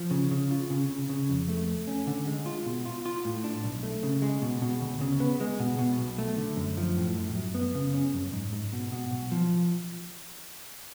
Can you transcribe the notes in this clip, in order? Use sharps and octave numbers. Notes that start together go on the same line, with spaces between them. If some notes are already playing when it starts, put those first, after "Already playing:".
Already playing: F3
C#3
C#3
F4
C#3
C#3
C#3
F2
A3
A3
C#4
D3
G#3
F4
B2
F4
F4
A2
D4
B1
A3
C#3
G#3
B2
B2
D2
C#3
B3
G#3
B2
B2
B1
A3
D3
F#2
F3
A2
F#2
F#2
B3
C#3
C#4
F#2
G#2
G#2
B2
B2
B1
F3